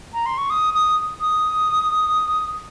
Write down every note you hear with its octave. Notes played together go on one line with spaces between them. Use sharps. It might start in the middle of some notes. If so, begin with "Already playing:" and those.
A#5
C6
C#6
D#6
D#6
D#6